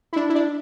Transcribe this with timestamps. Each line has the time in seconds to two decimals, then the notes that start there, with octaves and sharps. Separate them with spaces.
0.13 E4
0.16 D4
0.29 E4
0.35 D4